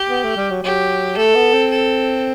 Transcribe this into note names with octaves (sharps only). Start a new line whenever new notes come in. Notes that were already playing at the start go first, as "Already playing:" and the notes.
Already playing: G4
B3
A3
G3
F#3
F#3 G4
A3 A4
B3
C4
A4